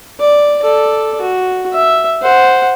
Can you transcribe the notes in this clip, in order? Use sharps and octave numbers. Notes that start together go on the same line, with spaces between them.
D5
A4 D5
F#4
E5
C5 F#5